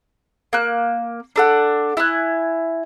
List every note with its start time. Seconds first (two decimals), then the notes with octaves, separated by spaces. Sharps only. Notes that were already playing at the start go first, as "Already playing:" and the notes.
0.53 A#3 F#6
1.36 D4 A4 F#5
1.97 E4 G#5 F#6